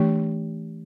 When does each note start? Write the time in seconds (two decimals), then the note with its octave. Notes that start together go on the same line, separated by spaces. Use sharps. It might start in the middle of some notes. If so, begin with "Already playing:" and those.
Already playing: E3 A3 D4 G4